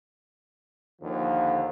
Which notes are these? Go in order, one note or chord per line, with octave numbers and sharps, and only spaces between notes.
D#2 D3 F3